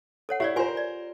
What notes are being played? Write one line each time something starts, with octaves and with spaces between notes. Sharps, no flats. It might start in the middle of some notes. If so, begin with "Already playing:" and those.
A4 C#5 F#5
E4 G4 C#5 D5
F4 A#4 C5 G#5 C6
D5